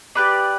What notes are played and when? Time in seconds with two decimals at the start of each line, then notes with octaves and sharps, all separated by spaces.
0.15 G4 B4 D5